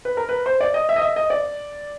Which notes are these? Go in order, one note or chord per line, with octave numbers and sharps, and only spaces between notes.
B4
A#4
B4
C5
D5
D#5
E5
D#5
E5
D#5
D5